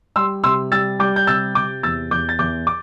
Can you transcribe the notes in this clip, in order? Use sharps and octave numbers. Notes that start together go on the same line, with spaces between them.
G3 C6 E6
C3 C6 E6
G3 E6 A6
G3 D6 G6
G6
C3 E6 A6
C3 D6 G6
E2 E6 A6
E2 D6 G6
A6
E2 D6 G6
D6